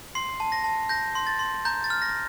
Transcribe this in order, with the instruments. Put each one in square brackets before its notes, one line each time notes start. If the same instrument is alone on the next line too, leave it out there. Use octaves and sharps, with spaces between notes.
[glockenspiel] C6 C7
A5
A#6
A5
G6 A#6
C6
A6
C6
A#5 G6
A6
F6
A#6